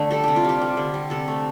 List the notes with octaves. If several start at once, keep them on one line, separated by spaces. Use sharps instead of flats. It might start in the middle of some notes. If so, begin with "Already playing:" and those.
Already playing: D3 A3 D4
G3 A4
C3 G4
F4
G3 G4
G3
D3
G3
C3 A4
A3